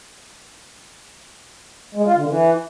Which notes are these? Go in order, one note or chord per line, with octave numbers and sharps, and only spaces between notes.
G#3
F4
D3
E3